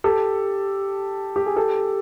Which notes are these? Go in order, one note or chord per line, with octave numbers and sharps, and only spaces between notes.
G4 A4
G4
G#4
G4 A4